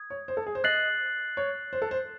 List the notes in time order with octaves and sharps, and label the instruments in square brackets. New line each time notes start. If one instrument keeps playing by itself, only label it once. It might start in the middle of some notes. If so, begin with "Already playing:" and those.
Already playing: [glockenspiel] D#6 G#6
[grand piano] C#5
C5
A4
G#4
C5
[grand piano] D#5 [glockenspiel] F#6 A6 C7 F#7
[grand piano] C#5
C5
A4
C5